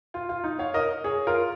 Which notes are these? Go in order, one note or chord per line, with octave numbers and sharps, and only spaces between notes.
F4
F4
D#4
C#5 F5
A#4 D#5
G#4 C#5
F4 A#4